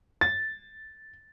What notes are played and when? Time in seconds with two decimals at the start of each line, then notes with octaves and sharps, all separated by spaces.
0.21 A6